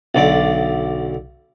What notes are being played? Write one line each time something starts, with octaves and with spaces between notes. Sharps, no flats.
B1 D3 D5